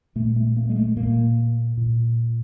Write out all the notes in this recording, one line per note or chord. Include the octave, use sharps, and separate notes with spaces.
A#2 A3
A3
A#3
G#3
A3
A#2 A#3
A#2